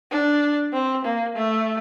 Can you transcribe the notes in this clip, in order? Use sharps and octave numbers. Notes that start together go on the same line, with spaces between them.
D4
C4
A#3
A3